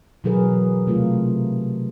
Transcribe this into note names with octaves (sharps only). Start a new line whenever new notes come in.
B2 E3 F#3 G#4 A#4 B4
C3 A3 F4 A#4